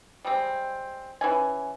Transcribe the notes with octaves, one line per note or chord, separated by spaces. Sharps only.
G3 G#3 C4
E3 C#4 G#5